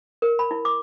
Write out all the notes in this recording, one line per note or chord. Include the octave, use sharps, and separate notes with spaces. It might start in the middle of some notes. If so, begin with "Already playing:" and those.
A#4
B5
E4
D6